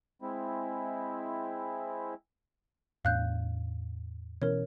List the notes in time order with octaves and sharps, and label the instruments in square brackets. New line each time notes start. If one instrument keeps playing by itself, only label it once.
[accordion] G#3 C4 E4
[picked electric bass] E2 A2 D4 [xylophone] F5 F#6 G6
[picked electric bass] B2 E3 C#4 [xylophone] A#4 C#5